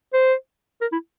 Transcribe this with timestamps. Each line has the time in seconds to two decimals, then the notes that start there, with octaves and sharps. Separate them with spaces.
0.14 C5
0.81 A#4
0.92 E4